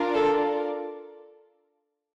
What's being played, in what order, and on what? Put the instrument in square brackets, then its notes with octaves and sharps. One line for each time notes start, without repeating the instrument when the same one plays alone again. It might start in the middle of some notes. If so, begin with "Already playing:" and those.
Already playing: [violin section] D4 F4 A#4 D5
[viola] A4